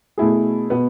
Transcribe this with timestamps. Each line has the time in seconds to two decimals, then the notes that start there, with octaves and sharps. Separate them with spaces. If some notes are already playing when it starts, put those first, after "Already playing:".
0.18 B2 A3 E4 G#4
0.70 B2 B3